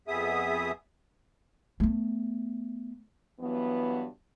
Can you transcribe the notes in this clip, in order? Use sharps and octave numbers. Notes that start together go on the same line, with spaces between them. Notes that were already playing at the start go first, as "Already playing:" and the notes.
F2 B3 G#4 E5 D#6
A3 B3
G2 E3 F#3 B3